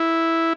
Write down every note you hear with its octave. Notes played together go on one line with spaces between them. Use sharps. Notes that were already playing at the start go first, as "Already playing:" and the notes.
Already playing: E4